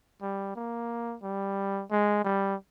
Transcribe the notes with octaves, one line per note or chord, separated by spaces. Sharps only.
G3
A#3
G3
G#3
G3